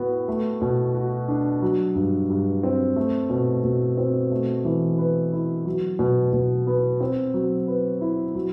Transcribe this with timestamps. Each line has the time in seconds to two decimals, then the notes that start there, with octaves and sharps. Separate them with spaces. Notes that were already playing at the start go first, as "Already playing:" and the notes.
Already playing: A2 B3 F#4
0.28 A3
0.62 B2
0.94 F#4
1.28 D4
1.62 F#3
1.95 G2
2.30 G2
2.63 C4
2.96 A3
3.30 B2
3.64 B2
3.97 C4
4.31 A3
4.65 E3
4.98 B4
5.33 E4
5.65 F#3
5.99 B2
6.33 B2
6.67 B3
7.01 C4
7.34 F#3
7.68 B4
8.01 E4
8.35 F#3